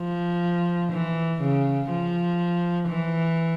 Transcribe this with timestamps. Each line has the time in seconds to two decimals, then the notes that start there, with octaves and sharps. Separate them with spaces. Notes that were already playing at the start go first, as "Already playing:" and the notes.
Already playing: F3
0.92 E3
1.41 C#3
1.90 F3
2.89 E3